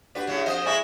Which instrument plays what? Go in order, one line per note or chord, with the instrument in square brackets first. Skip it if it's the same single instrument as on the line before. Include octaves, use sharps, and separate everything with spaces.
[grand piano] D4 F#4 G4 [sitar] B4
[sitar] A2 C#3 F#3
F2 C5 D#5
[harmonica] G#3 E4 E5 [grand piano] D5 G#5 C#6